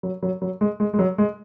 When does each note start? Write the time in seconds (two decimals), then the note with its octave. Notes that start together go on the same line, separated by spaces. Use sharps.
0.03 F#3
0.23 F#3
0.42 F#3
0.61 G#3
0.80 G#3
0.94 G#3
0.99 F#3
1.18 G#3